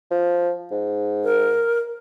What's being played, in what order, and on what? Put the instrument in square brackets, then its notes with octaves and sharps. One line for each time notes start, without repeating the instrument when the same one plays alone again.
[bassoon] F3
G#2
[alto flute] A#4